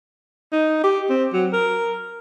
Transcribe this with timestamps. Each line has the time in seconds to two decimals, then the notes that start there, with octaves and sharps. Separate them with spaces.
0.52 D#4
0.84 G4
1.09 C4
1.33 F#3
1.53 A#4